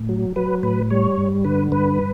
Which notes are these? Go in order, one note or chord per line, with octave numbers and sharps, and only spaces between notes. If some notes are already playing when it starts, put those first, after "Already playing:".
Already playing: A2
F#3
F#3 B4
A2 B4
G3 C#5
G2
D3 B4
G2 B4